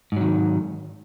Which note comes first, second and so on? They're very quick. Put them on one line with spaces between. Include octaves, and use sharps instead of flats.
G#2 F#3 D#3